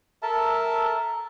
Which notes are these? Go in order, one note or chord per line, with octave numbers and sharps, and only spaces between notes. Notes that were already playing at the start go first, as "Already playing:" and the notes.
A4 A#4 E5 A5